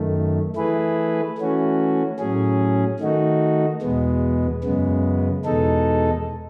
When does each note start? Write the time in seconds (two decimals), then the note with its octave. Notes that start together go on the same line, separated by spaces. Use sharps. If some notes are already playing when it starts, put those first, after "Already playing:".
Already playing: F#2 D#3 A3
0.56 E3 A3 E4 G#4 B4
1.38 E3 A3 C#4 F#4
2.19 A2 F#3 C#4 G#4
3.00 D#3 A3 D#4 F#4
3.82 E2 B2 G#3 B3
4.64 F#2 C#3 G#3 B3
5.45 E2 B2 G#3 D#4 A4